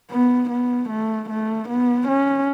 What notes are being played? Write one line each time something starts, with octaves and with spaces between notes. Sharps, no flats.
B3
B3
A3
A3
B3
C#4